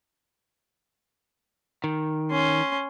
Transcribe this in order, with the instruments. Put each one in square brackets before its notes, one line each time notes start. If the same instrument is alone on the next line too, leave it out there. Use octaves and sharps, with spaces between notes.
[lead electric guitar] D#3
[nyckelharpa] C#4 C6